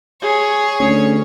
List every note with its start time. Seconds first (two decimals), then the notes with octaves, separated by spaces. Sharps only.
0.22 G#4 C#5
0.80 D2 C#4